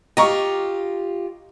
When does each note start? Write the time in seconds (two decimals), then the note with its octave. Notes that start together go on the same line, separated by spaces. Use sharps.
0.17 F4 G4 D#5 A#5 C#6